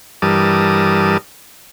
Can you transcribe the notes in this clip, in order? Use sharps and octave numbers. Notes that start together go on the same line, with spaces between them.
G2 E3 G3 A#4 A5 D#6